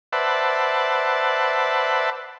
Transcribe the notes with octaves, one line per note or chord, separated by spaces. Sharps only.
B4 C5 D5 E5 F#5 A5